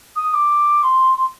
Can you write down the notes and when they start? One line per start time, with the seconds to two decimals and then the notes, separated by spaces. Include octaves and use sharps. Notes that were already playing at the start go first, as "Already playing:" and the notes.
0.16 D#6
0.34 D6
0.83 C6
1.17 C6